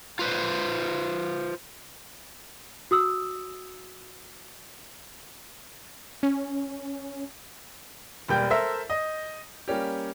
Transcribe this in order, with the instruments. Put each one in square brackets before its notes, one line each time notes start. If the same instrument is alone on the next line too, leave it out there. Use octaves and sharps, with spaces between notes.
[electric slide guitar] F4 B4 C5
[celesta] F#4 D#6 E6
[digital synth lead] C#4
[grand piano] E1 G3 A#3 G5 G6
A4 A#4 C5 E5
D#5
G3 A#3 C#4 G4